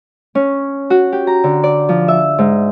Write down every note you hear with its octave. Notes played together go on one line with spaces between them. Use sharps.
C#4
F#4
G4
A#5
D3
D5
F3
E5
G#2